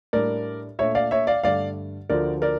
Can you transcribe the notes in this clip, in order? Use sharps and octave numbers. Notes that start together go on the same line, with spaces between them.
A2 G3 D4 A#4 D5
A#2 A3 D4 C#5 E5
D5 F5
C#5 E5
D5 F5
G2 D3 A3 D5 F5
D2 D3 F3 A3 A#4 D5
A#4 D5